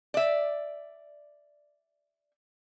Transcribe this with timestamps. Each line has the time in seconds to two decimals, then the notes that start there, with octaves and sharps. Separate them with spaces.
0.14 D5 E5